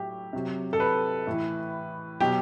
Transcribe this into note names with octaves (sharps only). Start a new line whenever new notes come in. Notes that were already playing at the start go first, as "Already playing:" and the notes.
Already playing: A2 F#3 G4
C3 F#3
A4
B4
A2 E3
B2 F#3 G4